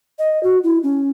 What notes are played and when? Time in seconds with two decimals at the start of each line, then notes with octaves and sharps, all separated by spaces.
0.19 D#5
0.43 F#4
0.64 E4
0.83 C#4